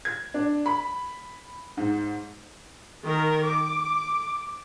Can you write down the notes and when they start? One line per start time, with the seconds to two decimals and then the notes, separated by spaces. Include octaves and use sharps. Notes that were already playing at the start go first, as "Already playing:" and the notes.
0.05 G#6
0.34 D4
0.66 B5
1.77 G#2
3.04 D#3 A#4
3.44 D6